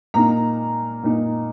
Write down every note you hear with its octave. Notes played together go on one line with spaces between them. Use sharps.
A#2 A#3 D#4 A#5
A#2 A#3 D#4